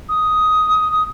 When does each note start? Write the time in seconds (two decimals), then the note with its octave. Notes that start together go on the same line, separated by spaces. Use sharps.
0.08 D#6
0.91 D#6